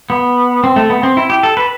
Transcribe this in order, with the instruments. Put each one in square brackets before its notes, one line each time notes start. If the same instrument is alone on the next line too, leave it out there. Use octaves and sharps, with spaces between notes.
[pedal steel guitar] B3
C4
A3
B3
C4
E4
G4
A4
B4